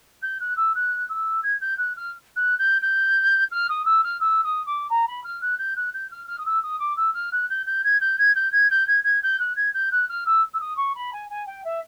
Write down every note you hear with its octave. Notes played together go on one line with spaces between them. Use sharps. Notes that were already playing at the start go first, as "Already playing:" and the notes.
G6
F#6
E6
F#6
E6
G#6
G6
F#6
F6
F#6
G6
G6
F6
D#6
E6
F6
E6
D#6
D6
A#5
B5
F6
F#6
G6
F#6
G6
F6
F6
D#6
E6
D#6
D6
E6
F6
F#6
G6
G6
G#6
G6
G#6
G6
G#6
G6
G#6
G#6
G6
F#6
G#6
G6
F#6
F6
E6
E6
D#6
C#6
B5
G#5
G#5
G5
E5